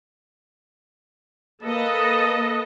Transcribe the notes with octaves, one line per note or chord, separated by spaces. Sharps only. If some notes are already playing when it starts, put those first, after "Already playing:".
A#3 A4 B4 D#5